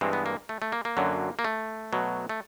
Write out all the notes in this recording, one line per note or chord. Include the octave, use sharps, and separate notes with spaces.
G2 E3 G#3 C4
B3
A#3
A3
A3
A#3
A#3
F#2 D3 F#3
A#3
A3
B2 F#3
A3